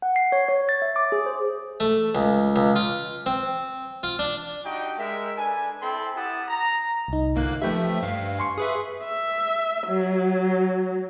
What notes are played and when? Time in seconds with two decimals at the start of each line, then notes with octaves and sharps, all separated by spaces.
0.02 F#5
0.16 C7
0.32 C#5
0.48 C#5
0.69 A6
0.82 E5
0.96 D6
1.12 G#4
1.26 C5
1.80 A3
2.15 C#2
2.56 C#2
2.76 F4
3.26 C4
4.03 F4
4.19 D4
4.64 D4 D#4 F#4 G4 G5
4.97 G#3 A#4 E5
5.37 D4 A4 B4 G#5
5.81 C4 E4 A4 G5 B5 C6
6.15 E4 G4 F#5 A5 D#6
6.48 A#5
7.08 C2 D#4
7.35 G1 A#3 F#6
7.62 F3 A3 G4 B4 E5 G5
8.02 G2 F5
8.39 G#5 C6 C#6
8.58 G#4 B4 E5
9.04 E5
9.87 F#3